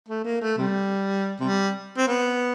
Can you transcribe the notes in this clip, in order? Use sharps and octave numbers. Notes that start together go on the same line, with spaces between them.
A3
A#3
A3
C3 G3
C3 G3
C4
B3